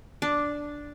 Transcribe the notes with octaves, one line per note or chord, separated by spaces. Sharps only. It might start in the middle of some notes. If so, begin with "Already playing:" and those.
D4